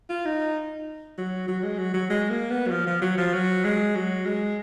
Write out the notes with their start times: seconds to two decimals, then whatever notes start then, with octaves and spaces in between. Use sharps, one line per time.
0.09 F4
0.25 D#4
1.18 F#3
1.48 F#3
1.63 G#3
1.78 F#3
1.94 F#3
2.10 G#3
2.30 A#3
2.50 B3
2.67 F#3
2.71 F3
2.87 F3
3.02 F#3
3.18 F3
3.34 F#3
3.64 G#3
3.95 F#3
4.25 G#3